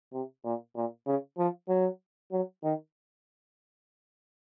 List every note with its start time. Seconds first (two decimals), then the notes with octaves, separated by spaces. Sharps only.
0.13 C3
0.45 A#2
0.76 A#2
1.07 C#3
1.38 F3
1.69 F#3
2.32 F#3
2.63 D#3